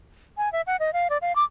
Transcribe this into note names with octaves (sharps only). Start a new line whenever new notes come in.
G#5
E5
F#5
D#5
F5
D5
F5
D6